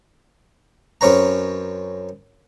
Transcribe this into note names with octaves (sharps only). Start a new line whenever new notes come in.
F#2 C4 C#4 B4 A#5